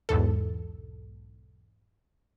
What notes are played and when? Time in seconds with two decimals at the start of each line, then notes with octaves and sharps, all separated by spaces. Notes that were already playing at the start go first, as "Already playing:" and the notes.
0.09 B1 E2 G#2 A4